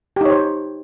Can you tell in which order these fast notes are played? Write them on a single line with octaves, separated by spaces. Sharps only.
G4 D#4 C#5 C5